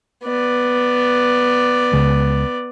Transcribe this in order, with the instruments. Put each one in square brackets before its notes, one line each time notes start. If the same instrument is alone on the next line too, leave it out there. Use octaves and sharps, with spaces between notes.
[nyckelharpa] B3 D5
[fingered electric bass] C#2